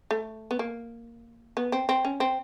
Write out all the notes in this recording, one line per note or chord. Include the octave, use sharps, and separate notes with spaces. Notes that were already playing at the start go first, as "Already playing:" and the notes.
A3
B3
A#3
B3
C4
C4
C#4
C4